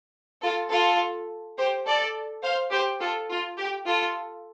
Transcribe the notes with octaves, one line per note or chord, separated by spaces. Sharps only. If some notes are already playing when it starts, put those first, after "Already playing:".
F4 A4
F4 A4
G4 C5
A4 D5
C5 F5
G4 C5
F4 A4
F4
G4
F4 A4